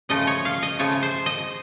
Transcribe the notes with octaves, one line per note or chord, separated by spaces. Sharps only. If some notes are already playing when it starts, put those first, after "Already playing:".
C#3 F3 A3 D#5
C#5
F5
D#5
C#3 F3 A3 C#5
C5
D#5